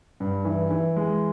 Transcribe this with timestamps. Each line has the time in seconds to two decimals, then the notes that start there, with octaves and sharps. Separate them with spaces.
0.20 G2
0.45 E3
0.70 E3
0.97 G#3